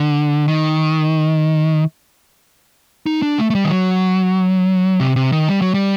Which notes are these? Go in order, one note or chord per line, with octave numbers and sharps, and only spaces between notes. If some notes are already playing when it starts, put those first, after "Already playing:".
Already playing: D3
D#3
D#4
D4
A3
A3
G3
D#3
F#3
C3
C3
D#3
G3
F#3
G3